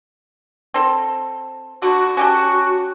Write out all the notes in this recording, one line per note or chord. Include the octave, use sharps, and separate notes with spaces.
C4 A4
D3 F#4
C#4 G4 A4